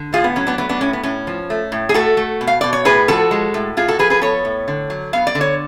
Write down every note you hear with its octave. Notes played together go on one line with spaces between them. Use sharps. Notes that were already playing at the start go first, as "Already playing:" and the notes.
Already playing: D3
A2 F4 G#4
B3
F#3 C#4
B3 D4
A3 B3 D4
B3 D4
A2 C#4
B3
A2 C#4
F3
A3
A2
G#4
A3 F#4 A4
A3
B2
F5
B2 D5
C#5
A2 G#4 B4
F3 F#4 A4
G#3
A2
A2 F4 G#4
F#4 A4
F3 G#4 B4
G#4 B4
B3 A4 C#5
A2
D3
F#3
B3 F5
D5
D3
C#5